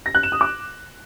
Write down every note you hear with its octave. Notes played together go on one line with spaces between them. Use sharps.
A#6
F#6
E7
D#6
D6